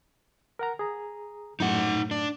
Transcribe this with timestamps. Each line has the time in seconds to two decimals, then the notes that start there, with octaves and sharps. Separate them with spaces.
0.59 A#4 F#5 A#5
0.79 G#4 A#5
1.60 F#2 A2 A3 D#4 F#5
2.11 D4